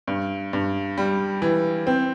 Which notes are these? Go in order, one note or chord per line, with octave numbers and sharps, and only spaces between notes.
G2
G2
G3
E3
C4